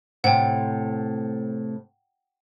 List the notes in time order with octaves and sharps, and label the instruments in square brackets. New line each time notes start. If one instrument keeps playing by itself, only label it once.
[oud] A2 C3 C5 [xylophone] F#5 G5